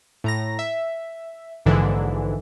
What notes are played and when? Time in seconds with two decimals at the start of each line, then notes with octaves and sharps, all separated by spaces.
0.24 A2 A#5 A#6
0.59 E5
1.66 A#1 G#2 D3 E3